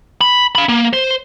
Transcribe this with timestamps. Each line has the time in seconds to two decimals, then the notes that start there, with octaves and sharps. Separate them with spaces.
0.21 B5
0.55 F5 B5
0.69 A#3
0.93 C5